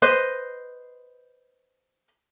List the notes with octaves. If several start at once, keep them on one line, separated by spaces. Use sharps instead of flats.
B4 C5 D#5